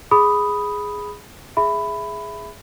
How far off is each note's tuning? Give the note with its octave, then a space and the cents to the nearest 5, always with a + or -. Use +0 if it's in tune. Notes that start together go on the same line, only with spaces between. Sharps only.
G#4 +0 B5 +0 D#6 +0
G#4 +0 E5 +0 B5 +15